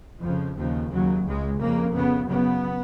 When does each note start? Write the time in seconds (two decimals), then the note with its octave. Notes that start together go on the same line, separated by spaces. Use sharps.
0.22 F2 C#3 F3
0.56 D#2 C#3 F3
0.91 D#2 C#3 F#3
1.25 C#2 C#3 G#3
1.59 F2 C#3 A#3
1.94 F2 C#3 B3
2.29 F#2 C#3 B3